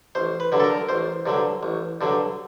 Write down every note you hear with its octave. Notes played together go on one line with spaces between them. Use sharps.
A1 C5
B4
G2 D3 F#3
A4
A#4
A1 C5
G2 D3 F#3
A1
G2 D3 F#3